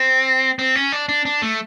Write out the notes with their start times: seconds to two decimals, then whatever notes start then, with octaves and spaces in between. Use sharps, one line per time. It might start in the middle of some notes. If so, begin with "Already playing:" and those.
Already playing: C4
0.59 C4
0.75 C#4
0.92 D4
1.09 D4
1.25 D4
1.42 A3